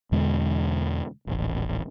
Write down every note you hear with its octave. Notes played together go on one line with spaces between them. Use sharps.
E2 B2 D3 G#3
D#1 A1